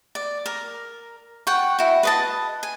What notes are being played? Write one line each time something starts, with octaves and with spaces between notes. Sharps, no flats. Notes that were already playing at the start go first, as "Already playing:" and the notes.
D5
A#4
F#5 G5 C#6
E4 F#4
B4 D#5 A5
G#5